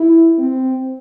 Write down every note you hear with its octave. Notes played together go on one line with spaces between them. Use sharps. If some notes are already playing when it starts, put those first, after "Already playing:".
Already playing: E4
C4